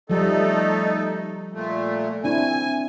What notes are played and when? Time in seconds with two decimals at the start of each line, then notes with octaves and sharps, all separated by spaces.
0.10 F3 G3 A3 D#4 A4
1.53 A#2 A3
2.24 C4 D4 E4 G#5